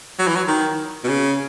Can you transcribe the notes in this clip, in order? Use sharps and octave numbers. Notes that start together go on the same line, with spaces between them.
F#3
E3
F#3
D#3
B2
C#3